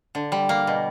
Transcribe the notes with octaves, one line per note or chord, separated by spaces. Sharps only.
D3
G3
A#3
B2